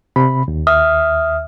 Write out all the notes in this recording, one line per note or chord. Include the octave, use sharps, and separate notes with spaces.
C3 B5
D#2
E5 D#6 F6